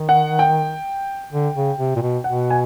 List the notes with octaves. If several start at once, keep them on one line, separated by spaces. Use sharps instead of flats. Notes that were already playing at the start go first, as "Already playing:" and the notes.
Already playing: D#3
F#5
G5
D3
C#3
C3
A#2
B2
B2 F#5
G#5